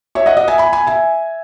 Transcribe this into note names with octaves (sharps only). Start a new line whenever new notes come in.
C#5 E5
D#5 F#5
D#5 F#5
E5 G#5
G#5 B5
G#5 B5
E5 G#5